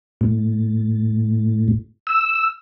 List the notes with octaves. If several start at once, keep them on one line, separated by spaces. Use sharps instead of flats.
A2
E6